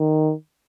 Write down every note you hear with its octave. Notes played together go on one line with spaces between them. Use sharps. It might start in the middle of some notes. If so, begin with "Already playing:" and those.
Already playing: D#3